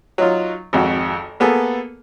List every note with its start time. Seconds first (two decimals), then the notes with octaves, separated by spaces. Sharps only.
0.18 F#3 D#4 F4
0.73 G#1 F2 F#4
1.40 A#3 B3 G#4 A4